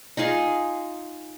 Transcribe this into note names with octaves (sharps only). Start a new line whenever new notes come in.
D#4 F4 G#4 F5